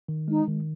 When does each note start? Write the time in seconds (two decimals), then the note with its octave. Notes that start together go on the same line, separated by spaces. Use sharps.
0.08 D#3
0.28 G#3 D#4
0.48 D#3